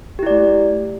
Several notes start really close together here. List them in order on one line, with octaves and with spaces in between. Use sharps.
G4 E4 D5 A3